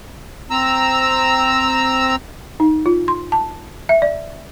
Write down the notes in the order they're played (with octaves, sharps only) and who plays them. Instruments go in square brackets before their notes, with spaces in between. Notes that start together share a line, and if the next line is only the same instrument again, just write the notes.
[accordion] C4 A#5 E6
[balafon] D#4
F4
C6
A5
E5
D5